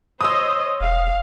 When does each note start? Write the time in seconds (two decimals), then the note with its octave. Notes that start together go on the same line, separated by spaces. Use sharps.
0.21 C5 C#5 D#5 D#6 E6
0.81 E1 F5